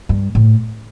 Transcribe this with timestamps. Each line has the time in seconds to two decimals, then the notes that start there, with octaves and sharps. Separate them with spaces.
0.09 G2
0.35 A2